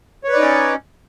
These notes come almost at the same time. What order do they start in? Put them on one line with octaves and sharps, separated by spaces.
C#5 B4 D5 D#4 C#4